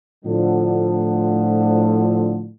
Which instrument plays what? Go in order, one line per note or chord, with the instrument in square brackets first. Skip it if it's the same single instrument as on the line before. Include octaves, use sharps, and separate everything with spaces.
[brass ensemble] A2 D3 F3